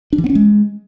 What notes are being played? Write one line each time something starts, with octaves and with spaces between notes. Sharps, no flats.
D4
E3
B3
C#4
G#3